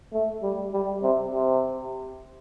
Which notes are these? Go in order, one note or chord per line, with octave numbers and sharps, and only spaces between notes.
A3
G3
G3
C3
C3